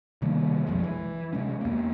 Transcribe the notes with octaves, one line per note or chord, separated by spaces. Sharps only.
C3 D#3 G3 A#3
B1 F2 G#3
E3
C3 G#3 C#4
E2 A#3